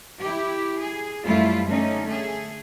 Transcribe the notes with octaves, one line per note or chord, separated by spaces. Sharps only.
E4 G4
G#4
F#2 F3 G3 A3 E4 F4
D3 A3 C#4 D#4
A3 G#4